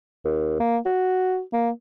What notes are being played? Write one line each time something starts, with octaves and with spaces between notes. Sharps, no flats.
D#2
A#3
F#4
A#3